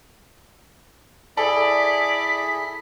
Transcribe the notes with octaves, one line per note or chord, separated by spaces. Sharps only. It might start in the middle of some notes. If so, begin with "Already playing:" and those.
E4 G#4 A4 D5 B6